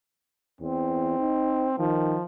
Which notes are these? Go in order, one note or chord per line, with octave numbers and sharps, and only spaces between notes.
E2 C4
D#4
D#3 F3